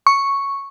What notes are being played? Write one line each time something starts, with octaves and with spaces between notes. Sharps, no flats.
C#6